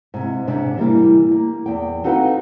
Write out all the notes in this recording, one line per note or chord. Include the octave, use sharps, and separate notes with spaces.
G#2 C3
G#2 C3 C4 D4
E3 G3 A#3 G4
A#3
E2 G5
C4 D#4 F#4 A4 B4 F5